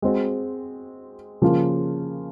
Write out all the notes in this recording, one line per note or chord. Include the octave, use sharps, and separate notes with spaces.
G#3 C4 F#4
C#3 F3 A#3 F4